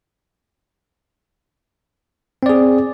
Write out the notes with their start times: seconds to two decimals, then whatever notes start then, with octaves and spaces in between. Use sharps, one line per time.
2.43 C4
2.46 D5
2.49 G#4